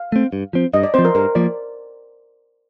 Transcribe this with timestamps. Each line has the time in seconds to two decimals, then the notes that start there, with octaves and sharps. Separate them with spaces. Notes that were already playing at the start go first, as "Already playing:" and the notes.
Already playing: F5
0.12 A3 C4
0.33 G2
0.53 F3 C4
0.73 G2 D#5
0.83 D5
0.94 F3 C4 C5
1.05 A#4
1.15 G2 A#4
1.35 F3 A#3 D5